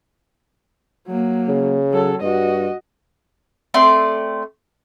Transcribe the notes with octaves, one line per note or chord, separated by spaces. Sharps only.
F#3 A#3
C#3
F#3 A4
G2 F#4 D#5
A3 C4 D5 C6